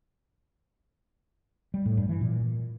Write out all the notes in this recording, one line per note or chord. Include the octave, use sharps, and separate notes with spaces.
G3
A2
G2
E3
A#2